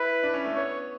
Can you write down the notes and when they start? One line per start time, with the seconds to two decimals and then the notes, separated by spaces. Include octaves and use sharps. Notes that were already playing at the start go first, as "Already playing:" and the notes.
Already playing: E4 B4
0.23 D4
0.34 C#4
0.45 A3
0.56 B3 C#5